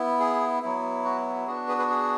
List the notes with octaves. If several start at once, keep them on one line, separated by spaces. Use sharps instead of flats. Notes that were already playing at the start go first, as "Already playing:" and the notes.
Already playing: B3 E4
G#4
F#3 B3 E4
F#4
B3 D4 F#4 G#4
G#4 B4
G#4 B4
G#4